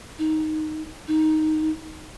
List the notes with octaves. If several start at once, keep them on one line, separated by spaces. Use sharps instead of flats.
D#4
D#4